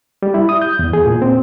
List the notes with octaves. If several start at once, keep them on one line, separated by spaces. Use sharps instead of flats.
G3
E4
D#6
G6
E2
G#4
A#2
C4